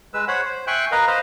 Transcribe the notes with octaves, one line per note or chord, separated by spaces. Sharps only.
G#3 B4 E6
C5 C#5 F#5 B5
C5
E5 G5 G#5 C6 C#6 F#6
A#4 B4 D#5 F5
B4 C5 D#5 F5